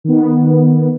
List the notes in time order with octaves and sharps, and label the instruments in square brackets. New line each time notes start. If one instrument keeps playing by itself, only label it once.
[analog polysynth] D#3 B3